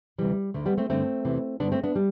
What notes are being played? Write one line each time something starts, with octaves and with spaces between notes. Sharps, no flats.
D2 C3 E3 G3
D2 D3 A3
G3 B3
A3 C4
G2 D3 A3 C4
E2 C3 E3
G2 D3 B3 D4
A3 C4
B3 D4
G3